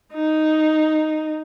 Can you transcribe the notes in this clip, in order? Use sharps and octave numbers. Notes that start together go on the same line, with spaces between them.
D#4